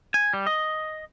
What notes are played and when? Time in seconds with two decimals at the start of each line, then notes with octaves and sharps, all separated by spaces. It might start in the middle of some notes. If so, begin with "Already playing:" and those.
0.14 G#5
0.34 G3
0.47 D#5